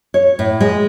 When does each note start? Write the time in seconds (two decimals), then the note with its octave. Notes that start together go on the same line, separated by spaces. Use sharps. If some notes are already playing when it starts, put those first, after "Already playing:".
0.14 C#5
0.39 A2
0.61 G#3